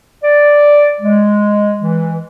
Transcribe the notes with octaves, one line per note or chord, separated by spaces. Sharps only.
D5
G#3
E3